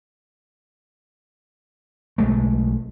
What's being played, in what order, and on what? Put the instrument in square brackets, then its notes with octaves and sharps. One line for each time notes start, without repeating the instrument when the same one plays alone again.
[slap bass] B1 G#3 A3